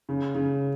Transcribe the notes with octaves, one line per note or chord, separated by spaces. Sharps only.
C#3
C#3